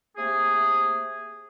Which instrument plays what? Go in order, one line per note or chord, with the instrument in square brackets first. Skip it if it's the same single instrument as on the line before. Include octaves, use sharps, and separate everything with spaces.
[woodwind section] C3 A3 A#3 G#4